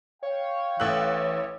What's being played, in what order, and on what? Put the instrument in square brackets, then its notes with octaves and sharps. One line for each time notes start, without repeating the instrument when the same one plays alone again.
[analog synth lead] C#5 [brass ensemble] F5 G5
[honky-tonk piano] A1 A3 F#6 [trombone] E3